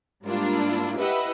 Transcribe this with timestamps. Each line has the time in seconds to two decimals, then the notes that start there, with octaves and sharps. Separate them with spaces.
0.24 G#2 G3 A#3 D4 E4 F4
0.99 E4 G4 B4 D#5 E5 F#5